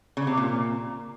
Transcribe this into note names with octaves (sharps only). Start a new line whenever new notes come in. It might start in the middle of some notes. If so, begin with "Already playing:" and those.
C#3
C3
A#2